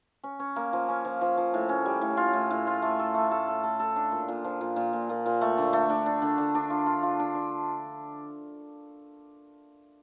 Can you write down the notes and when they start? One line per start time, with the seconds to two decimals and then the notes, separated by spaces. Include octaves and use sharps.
0.24 C#4
0.39 C#4
0.56 A#3
0.73 F3
0.88 C#4
1.05 F3
1.21 F3
1.37 F3
1.54 A2
1.69 C#4
1.85 G3
2.02 A2
2.17 F4
2.33 A2
2.51 A2
2.67 F4
2.82 A3
2.99 A4
3.14 A3
3.31 A4
3.48 A4
3.64 A4
3.80 A4
3.96 D4
4.12 A#2
4.28 A#2
4.44 F3
4.61 A#2
4.76 A#2
4.93 A#2
5.09 A#2
5.26 A#2
5.41 A3
5.58 D3
5.73 A3
5.90 D4
6.06 D4
6.22 D3
6.38 D3
6.55 D4
6.70 F4
6.87 F4
7.03 F4
7.20 D4
7.35 D4